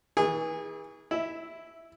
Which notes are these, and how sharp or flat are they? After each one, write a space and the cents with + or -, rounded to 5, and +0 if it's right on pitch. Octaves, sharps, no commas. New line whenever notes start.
E3 -40 G#4 -20
E4 +0 E5 -15